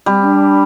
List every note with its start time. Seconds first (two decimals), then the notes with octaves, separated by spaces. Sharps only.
0.06 G3 C4
0.23 D4